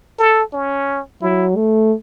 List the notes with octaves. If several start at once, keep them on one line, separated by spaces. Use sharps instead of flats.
A4
C#4
F#3 E4
A3